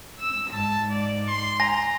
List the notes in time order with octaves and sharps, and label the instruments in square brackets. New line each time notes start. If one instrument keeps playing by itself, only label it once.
[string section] E6
[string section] G#2 [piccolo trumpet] A5
[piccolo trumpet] D5
C6
[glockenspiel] G#5 A#6 [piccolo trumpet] A#5